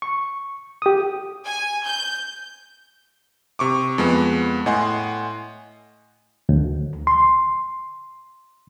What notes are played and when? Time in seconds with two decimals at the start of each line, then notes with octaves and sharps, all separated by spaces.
0.02 C#6
0.82 G4 D#6
1.46 G#5
1.85 G6
3.59 C3 C#6 D6
3.98 F2 G#3 B3
4.66 A2 D#5 F#5 G#5 C6
6.49 D2
7.07 C6